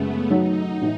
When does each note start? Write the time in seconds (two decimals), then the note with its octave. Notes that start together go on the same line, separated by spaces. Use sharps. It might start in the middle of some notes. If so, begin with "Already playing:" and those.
Already playing: F#2 C#3 G#3 A3 B3
0.30 D#3 F#3 A3 D#4
0.81 A2 E3 D#4